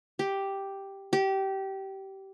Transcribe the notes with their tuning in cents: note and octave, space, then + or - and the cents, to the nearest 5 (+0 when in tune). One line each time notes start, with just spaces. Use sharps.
G4 +0
G4 -20